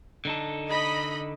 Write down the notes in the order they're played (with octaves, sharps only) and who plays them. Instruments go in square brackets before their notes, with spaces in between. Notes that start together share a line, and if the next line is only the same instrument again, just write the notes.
[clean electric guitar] D3 D#4 A4
[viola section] D#5 B5